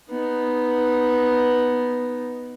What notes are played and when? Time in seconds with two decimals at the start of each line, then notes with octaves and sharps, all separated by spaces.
0.10 B3 D#4